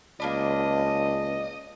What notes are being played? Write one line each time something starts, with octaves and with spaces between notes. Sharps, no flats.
C#2 A#3 D4 D#5 B5